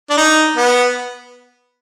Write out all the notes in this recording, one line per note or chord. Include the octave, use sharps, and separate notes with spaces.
D4
D#4
B3